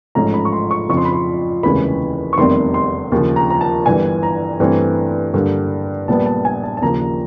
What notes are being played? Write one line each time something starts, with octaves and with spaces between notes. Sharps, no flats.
A1 G#2 F3 A3 C#4 A#5
B5
C#6
C6
C#6
F2 C#3 F3 C#6
C6
B5
C6
F1 D#2 C#3 E3 G#3 B5
C#6
F1 E2 C3 D#3 G3 C6
C6
D#2 C#3 F3
A#5
A#5
A5
G1 G2 E3 G#5
A#5
G2 E3 A3 C4
G2 D3 G3 A#3
A#1 A#2 G3 B3 A5
A5
G#5
A5
A5
D#2 C#3 F3 A#3 A#5